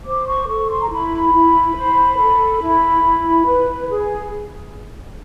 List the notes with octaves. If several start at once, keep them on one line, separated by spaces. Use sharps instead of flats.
C5 D6
C#6
A4 C#6
C6
A#5
E4 B5
E4
C5
A4
E4
E4
B4
G#4